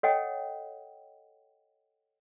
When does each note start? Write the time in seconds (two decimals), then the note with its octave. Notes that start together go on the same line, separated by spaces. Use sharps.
0.03 A4 C#5 D#5 F#5 G5